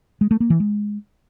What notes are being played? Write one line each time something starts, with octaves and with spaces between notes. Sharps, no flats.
G#3
A3
A#3
E3
G#3